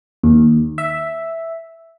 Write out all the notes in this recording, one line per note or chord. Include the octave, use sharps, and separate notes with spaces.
D#2
E5